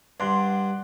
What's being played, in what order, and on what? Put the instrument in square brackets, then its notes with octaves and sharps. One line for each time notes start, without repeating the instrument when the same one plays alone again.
[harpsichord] G2 [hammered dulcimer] D5 F#5 C6